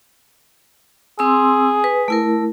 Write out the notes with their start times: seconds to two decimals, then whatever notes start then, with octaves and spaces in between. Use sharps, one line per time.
1.19 C4 G#4 C6 E6
1.84 B4
2.08 A3 E4 A#4